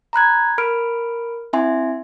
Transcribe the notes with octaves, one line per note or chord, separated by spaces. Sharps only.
A#5 B5 F#6 G#6
A#4 B5 F6 D7
C4 E4 E5 G#5 C6